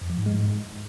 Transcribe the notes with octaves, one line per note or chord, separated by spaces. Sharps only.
F2
F3
G#2
G#3
G#2